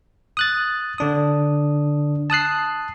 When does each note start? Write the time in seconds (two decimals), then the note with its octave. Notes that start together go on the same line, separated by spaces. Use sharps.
0.37 D#6 F#6 A6
0.98 D3 D4 D#6
2.30 A5 D#6 F#6 C7